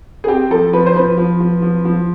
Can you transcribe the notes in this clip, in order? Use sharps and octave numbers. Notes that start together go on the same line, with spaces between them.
G#4
C4 G4
F3 A4
F3 B4
C5
F3 B4
F3
F3
F3
F3